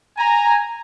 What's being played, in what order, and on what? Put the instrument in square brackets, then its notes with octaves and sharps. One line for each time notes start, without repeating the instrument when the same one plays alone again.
[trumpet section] G#5 A#5